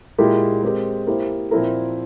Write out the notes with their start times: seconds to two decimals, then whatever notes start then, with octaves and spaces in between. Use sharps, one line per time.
0.18 A#2 G#3 E4 G4 A#4
0.63 G#3 C4 G4 A#4
1.07 A#3 E4 G4 C5
1.51 A#2 F3 C4 E4 A#4